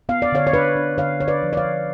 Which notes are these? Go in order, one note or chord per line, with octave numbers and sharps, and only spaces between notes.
B3 F5
D5
D3 C#5 F5
C#5
D4 B4 D5
D4
D3 C#5 F5
D3 C#5
B4 D5
F3
D5
C#5 F5
F3